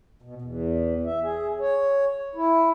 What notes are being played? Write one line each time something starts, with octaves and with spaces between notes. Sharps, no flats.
B2
E2
E5
G#4
C#5
E4